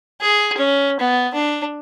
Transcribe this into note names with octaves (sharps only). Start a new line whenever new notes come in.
G#4
C#4
B3
D4